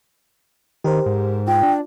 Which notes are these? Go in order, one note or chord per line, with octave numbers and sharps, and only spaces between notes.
D#3 G4 A#4 C5
G#2
F4 G5
D4